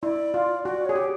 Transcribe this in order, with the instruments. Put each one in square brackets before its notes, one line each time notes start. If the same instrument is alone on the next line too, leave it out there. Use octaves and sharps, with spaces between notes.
[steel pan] E4 [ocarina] D5
[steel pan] F4
[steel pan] F#4 [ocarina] D5
[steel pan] G#4 [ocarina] C#5
[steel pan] G4